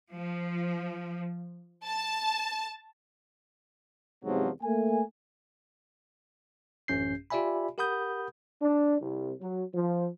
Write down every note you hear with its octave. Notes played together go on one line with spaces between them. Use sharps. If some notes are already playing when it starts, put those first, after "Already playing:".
F3
A5
E2 G#2 C3 F3 F#3
A3 A#3 G#5
A1 F#2 C#4 G6 C7
F4 G4 D5 E5 G#5 B5
G4 A#4 F#5 B5 D#6 G6
D4
C2
F#3
F3